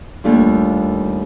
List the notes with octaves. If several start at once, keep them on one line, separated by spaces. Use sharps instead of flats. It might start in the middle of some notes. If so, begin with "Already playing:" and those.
D#2 G3 A3 D4 F4